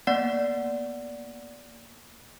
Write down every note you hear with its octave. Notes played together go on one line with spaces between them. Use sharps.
A#3 B3 D5 F#5 C7